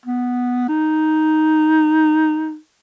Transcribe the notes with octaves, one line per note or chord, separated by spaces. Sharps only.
B3
D#4